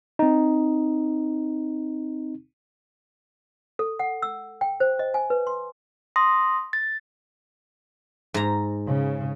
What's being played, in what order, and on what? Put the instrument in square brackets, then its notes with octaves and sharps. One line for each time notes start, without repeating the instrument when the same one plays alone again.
[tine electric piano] C4 D#4
[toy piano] A4
F#5
E6
G5
C5
D#5
G#5
B4
C6
[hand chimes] C6 D#6 A#6
A6
[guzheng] G#2 A#5
[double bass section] C#3